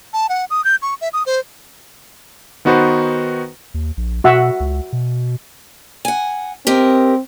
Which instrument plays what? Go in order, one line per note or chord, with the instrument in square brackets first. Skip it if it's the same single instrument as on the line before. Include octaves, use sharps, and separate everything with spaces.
[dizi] A5
F#5
D#6
G6
C#6
E5
D#6
C5
[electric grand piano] D#3 B3 D#4 F#4 B4 C5
[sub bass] D#2
A#1
[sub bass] B2 [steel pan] F#4 E5 F#5
[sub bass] C#2
B2
[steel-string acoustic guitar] F#5 G#5
[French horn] C4 [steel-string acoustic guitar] G4 A#4 D#5